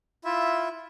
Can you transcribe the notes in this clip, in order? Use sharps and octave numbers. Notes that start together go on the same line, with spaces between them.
E4 F4 E5